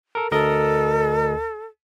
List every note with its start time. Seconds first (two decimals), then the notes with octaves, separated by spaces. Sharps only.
0.15 A4 A#4
0.32 D2 A4 A#4 D#5